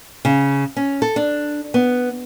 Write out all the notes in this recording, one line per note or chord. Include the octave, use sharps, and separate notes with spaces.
C#3
C#4
A4
D4
B3